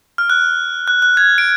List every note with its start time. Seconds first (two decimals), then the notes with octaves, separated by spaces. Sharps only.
0.18 F6
0.30 F#6
0.88 F#6
1.02 F#6
1.17 G#6
1.38 D7